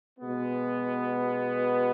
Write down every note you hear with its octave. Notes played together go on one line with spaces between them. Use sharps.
B2 G#3 B3